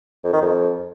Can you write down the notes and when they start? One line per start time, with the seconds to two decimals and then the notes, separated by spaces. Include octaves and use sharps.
0.24 F2
0.33 D#3
0.42 F2